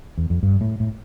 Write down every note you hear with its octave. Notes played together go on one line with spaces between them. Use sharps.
E2
F2
G2
A2
A2